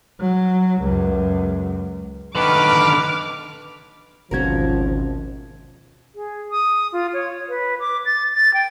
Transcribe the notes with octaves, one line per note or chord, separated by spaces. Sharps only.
F#3
C#2 F#2
D3 D#3 B4 D6 F6
G#1 D2 B2 F3 C#4 F#4 A#4 G#6
G#4
D#6
F4
C#5
B4
D6
A6
A6
G5